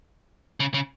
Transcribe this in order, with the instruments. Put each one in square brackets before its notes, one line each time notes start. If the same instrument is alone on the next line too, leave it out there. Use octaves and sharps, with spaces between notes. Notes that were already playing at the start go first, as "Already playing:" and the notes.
[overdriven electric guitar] C#3
C#3